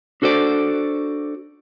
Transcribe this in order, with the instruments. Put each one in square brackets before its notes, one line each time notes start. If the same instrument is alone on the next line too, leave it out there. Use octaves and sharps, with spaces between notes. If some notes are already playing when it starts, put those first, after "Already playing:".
[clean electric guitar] D4 F#4 A4 C5 D5